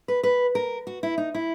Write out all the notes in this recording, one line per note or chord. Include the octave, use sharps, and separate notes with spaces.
B4
B4
A#4
F#4
E4
D#4
E4